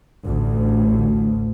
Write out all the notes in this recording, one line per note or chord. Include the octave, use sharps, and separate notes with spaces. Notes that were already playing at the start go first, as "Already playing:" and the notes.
A1 D2